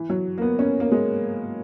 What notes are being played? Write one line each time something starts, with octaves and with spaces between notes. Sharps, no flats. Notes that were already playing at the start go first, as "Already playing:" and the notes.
Already playing: E3
F#3
A#3
B3
C#4
A#3
G#3